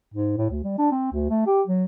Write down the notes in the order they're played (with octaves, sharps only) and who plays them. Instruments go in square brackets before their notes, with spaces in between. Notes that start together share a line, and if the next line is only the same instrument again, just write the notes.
[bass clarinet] G#2
A2
D2
G3
D4
C4
D2
A3
G4
F#3